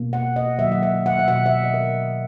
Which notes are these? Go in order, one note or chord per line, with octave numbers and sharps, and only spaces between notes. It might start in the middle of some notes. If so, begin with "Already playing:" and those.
Already playing: B2 A#3
F#5
D#5
D#3 F#3 A#3 E5
F#5
E5
F#5
E5
B2 A#3 F#5
E5
D#5
A#4